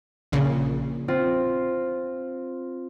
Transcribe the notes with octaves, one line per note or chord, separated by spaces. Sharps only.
A#1 A#2 C#3
C4 F4